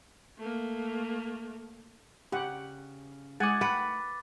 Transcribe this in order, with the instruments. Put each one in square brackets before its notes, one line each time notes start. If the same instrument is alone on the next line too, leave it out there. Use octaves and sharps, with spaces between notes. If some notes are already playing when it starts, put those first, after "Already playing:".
[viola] A3 A#3
[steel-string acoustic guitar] C#3 [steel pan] G4 F#5
[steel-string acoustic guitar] G#3 E4 [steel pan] G#4 F#5 G#5 [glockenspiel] D6 A6
[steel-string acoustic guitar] A3 G5 [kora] B4 [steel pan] F#5